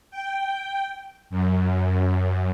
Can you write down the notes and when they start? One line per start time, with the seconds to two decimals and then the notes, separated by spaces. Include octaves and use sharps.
0.11 G5
1.30 F#2